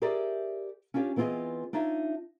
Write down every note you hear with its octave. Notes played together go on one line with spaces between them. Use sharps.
G4 G#4 A#4 C5 D5 E5
C#4 D4 F4 G4 C#5
E3 B3 C4 F4 G#4 D#5
D4 D#4 F4 C#5 E5